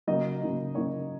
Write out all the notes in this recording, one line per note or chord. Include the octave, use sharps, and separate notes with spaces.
C#3 F#3 A#3 D#4 D#5
C#3 F#3 A#3 D#4
C#3 F#3 A#3 D#4 C#5